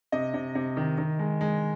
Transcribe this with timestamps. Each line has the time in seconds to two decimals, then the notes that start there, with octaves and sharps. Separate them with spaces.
0.12 C3 D#5
0.34 C3
0.55 C3
0.77 D#3
0.98 D#3
1.19 G#3
1.41 G#3